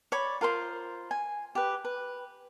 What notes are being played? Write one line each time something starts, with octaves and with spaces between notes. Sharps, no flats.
C#5 D5 B5
F4 A#4 C5 C6
G#5
G4 B4
B4